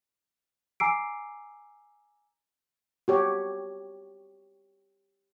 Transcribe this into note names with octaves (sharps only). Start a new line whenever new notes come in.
G#5 A#5 D6 E6 C7 D7
F#4 G4 C#5